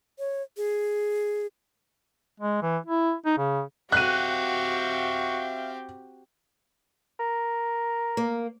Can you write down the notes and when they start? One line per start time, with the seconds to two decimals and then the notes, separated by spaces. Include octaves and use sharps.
0.19 C#5
0.57 G#4
2.40 G#3
2.63 E3
2.86 E4
3.26 D#4
3.38 C#3
3.92 C4 F#4 G4 E5 F5 F#6 D#7
7.19 A#4
8.17 A#3